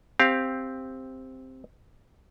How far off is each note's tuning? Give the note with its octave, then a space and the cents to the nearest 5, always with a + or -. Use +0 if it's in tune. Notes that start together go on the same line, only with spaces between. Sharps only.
C4 +0 G4 +10 F5 +0